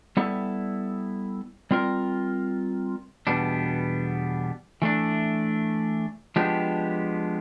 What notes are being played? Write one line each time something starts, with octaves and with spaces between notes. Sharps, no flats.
G3 B3 E4 A4
G3 C4 F4 A#4
E2 B2 G3 B3 D4
E3 A3 D4
F3 G#3 B3 D4 G4